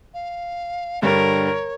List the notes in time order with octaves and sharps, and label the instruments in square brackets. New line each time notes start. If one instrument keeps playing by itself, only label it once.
[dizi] F5
[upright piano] G2 D3 G3 [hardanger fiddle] A#4 [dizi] C#5